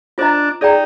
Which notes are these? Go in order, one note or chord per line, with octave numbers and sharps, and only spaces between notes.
D4 F4 C5 D#5 A#5
D#4 G#4 D5 G5 A#5